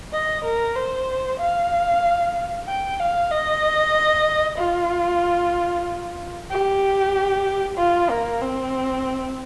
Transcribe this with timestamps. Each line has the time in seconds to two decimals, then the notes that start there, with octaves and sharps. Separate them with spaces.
0.13 D#5
0.44 A#4
0.76 C5
1.39 F5
2.68 G5
3.00 F5
3.31 D#5
4.58 F4
6.51 G4
7.78 F4
8.10 A#3
8.41 C4